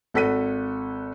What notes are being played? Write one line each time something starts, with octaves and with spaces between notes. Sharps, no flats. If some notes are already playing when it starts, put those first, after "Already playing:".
G#1 A4 F#5 B6 D#7